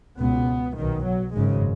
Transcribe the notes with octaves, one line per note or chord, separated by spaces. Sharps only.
C#2 B2 B3
B1 B2 D#3
F#3
G#1 F#2 C#3 G#3